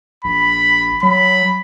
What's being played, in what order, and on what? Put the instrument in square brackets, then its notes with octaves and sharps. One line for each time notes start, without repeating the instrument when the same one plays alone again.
[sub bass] A#1 [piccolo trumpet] B5
[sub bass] F#3 [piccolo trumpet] B5